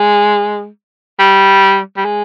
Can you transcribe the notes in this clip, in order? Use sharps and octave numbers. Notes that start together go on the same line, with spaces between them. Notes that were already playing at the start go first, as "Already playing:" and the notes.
Already playing: G#3
G3
G3
G#3